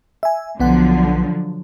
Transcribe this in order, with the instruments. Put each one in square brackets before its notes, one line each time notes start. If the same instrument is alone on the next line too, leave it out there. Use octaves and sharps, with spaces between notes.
[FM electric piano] E5 G#5
[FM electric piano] B1 B3 F#5 [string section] D3 F3 F#3